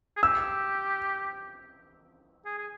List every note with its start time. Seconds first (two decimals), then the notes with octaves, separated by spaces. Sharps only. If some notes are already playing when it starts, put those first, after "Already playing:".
0.17 G#4
0.23 G4 E6
2.46 G#4
2.58 G#4